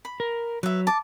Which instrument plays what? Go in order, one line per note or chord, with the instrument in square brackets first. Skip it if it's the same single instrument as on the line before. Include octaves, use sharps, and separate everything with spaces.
[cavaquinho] B5
[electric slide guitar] A#4
[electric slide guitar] F#3 [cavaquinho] B4 E5
[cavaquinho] A5 D6